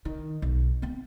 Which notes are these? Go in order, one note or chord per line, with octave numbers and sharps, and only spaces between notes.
D#3
B1
B3 C4